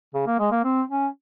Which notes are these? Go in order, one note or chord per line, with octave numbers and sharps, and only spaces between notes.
C#3
A#3
G#3
A#3
C4
C#4